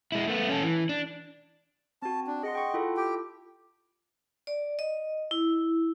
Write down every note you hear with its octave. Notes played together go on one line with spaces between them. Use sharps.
G#3 E4
A3 B3
C#4 A4
E3
D4
C4 F#4 A5
D4
G#4 D#5 F#5 C6
G5 C#6
E4 F4 A4
G4 G5
D5
D#5
E4